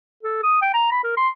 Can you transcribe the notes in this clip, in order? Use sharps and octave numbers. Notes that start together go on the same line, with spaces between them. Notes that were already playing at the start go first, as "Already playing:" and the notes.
A4
D#6
G5
A#5
B5
A#4
C6